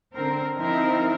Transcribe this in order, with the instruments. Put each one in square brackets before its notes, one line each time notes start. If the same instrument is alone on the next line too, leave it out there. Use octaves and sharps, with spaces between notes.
[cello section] D3 C4 A#4
F3 C4 D#4 E4 A#4